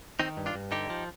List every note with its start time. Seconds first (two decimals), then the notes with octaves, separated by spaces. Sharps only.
0.20 D#3 C4 D#4
0.37 G2
0.46 D4 F4
0.55 G2
0.72 D3 D#4 G4
0.90 F3